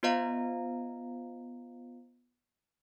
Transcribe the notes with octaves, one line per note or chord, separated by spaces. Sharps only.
B3 F4 C5 D#5 F5 A#5